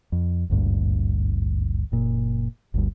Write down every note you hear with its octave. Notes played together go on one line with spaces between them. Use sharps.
F2
G#1 D2 G2 A#2
F#1 A#2
G1 D2 G2